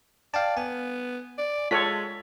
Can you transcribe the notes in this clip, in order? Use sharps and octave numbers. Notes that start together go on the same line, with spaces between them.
D5 F5 G5 A5
B3 G#5
D5
G#3 F4 A4 C#5 B6